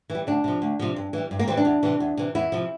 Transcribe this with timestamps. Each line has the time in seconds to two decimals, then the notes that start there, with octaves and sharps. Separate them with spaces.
0.10 E3
0.15 G3
0.27 D2 D4
0.44 C3 F3
0.62 D2
0.79 C3 F3
0.96 G2
1.13 E3 G3
1.31 G2
1.39 A#3
1.48 E3 G3 C4
1.57 D4
1.65 E2
1.83 C3 E3
2.00 E2
2.17 C3 E3
2.35 E2 E4
2.52 C3 F3